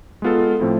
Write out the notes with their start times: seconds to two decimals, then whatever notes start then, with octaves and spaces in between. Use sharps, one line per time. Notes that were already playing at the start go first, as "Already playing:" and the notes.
0.22 G#3 B3 F4 A4
0.60 A2 F3 A3 C4 E4